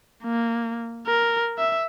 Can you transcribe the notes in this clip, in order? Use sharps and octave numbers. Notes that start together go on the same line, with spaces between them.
A#3
A#4
E5